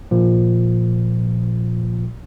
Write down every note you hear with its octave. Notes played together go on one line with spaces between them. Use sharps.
A#2 F3